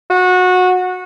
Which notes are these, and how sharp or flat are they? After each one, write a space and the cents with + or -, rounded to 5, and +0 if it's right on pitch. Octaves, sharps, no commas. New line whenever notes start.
F#4 -20